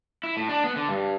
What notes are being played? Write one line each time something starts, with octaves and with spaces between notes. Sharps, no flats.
E4
A2
D4
B3
D3
G2